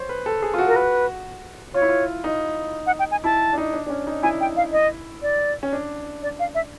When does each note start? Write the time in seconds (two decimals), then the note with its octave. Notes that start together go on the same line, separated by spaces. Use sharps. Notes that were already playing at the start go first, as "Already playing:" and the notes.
Already playing: C5 C#5
0.09 B4
0.26 A4
0.42 G#4
0.54 F4
0.58 F#4
0.68 A#4
0.76 B4
1.74 F4 C#5
1.82 E4
1.89 F4
2.24 D#4
2.87 F#5
2.99 G5
3.11 G#5
3.24 E4 A5
3.53 D4
3.58 D#4
3.74 D4
3.86 D4
3.90 C#4
4.07 D#4
4.23 E4 G#5
4.41 G5
4.57 F5
4.73 D#5
5.22 D5
5.63 C#4
5.73 D4
6.23 D5
6.39 F5
6.55 E5